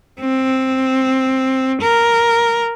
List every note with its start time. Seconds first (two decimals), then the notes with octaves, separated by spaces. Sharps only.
0.20 C4
1.81 A#4